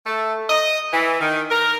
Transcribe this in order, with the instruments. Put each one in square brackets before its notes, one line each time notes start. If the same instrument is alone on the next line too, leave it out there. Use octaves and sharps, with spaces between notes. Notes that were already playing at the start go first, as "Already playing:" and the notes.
[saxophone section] A3
D#5
E3
D#3
A#4